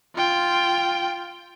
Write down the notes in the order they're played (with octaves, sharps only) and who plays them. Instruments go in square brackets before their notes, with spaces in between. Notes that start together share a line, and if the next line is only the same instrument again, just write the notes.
[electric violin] F4 G5